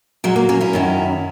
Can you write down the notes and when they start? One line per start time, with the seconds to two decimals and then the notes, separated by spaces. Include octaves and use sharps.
0.24 A#2 F#3 G#3
0.36 A#3
0.49 A#3 C#4
0.61 C#4 E4
0.73 F#2 D#3 F#3